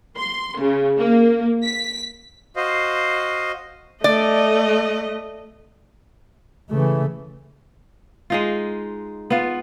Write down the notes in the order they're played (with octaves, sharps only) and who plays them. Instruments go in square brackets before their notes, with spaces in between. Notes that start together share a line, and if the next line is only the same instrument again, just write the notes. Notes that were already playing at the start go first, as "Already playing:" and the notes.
[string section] C6
C#3
A#3
B6
[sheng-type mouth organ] F#4 C5 D#5 F5
[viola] A3 D#5 [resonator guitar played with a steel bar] D5
[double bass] C#3 A3 [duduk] E3
[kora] G#3 D#4 F4
B3 F4